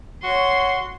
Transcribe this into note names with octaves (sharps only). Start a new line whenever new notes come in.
F#4 C#5 C6